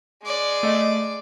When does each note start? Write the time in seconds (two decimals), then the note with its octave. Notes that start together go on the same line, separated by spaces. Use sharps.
0.23 G#3 D5
0.63 A3 D#5